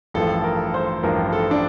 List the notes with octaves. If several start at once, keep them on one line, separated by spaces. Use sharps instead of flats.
A1 G2 F3 A4
A#4
C5
A1 G2 F3 A#4
A4
D4